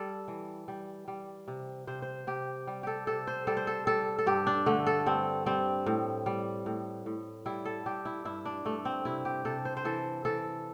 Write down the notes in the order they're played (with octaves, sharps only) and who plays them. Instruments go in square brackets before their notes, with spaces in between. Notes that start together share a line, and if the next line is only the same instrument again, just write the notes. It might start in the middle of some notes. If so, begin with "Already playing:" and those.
Already playing: [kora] G3 A4
E3
G3
G3
C3
C3 C5
C5
C3 G4
G3
G4 A4
C3 A4
C5
G3 A4
C5
A4
G3 A4
A4
G2 G4
D4
D3 A3
A4
G2 C4
G3 C4
A2
G3
A2
A2
G3 E4
A4
G3 G4
E4
G2 E4
D4
G2 A3
C4
C3 E4
G4
C3 A4
C5
C5
E3 A4
E3 A4